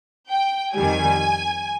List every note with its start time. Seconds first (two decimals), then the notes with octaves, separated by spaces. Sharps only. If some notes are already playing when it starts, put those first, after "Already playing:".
0.30 G5
0.74 F2 D#3 G3 G#5